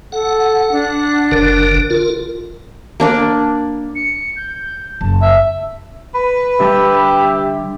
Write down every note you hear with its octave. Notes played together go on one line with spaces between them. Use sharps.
A4 F#5
D4
F#1 D3 A#4
F4 A#4
A#3 D4 D5
C#7
G6
F#1 A5
E5
B4
D3 G3 G4 E5 A5